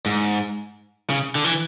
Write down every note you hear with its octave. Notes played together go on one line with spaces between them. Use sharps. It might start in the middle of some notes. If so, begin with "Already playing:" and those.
G#2
C#3
D3
E3